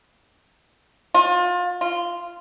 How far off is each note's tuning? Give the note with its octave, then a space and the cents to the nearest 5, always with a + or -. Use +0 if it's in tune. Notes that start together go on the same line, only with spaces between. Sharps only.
F4 +30
F4 -10